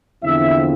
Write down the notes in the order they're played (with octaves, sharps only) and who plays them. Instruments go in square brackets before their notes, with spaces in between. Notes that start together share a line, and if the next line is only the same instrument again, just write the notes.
[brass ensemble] E2 D3 F3 C4 E4 E5